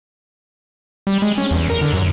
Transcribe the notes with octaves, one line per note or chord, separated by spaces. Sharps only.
G3
G#3
C#4
E2
A#4
D3
F#2